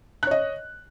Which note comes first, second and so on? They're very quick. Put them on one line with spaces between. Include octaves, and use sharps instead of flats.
F#6 C#5 D#5